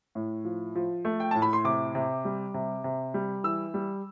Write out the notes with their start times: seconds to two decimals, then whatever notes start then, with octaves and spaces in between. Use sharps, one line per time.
0.15 A2
0.45 F3
0.75 F3
1.05 A3
1.20 G5
1.31 A2 A5
1.42 B5
1.53 C6
1.64 C3 D6
1.95 C3
2.25 G3
2.54 C3
2.84 C3
3.14 G3
3.44 E3 E6
3.74 G3